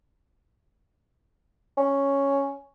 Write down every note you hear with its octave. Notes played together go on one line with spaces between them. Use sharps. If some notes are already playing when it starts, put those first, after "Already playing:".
C#4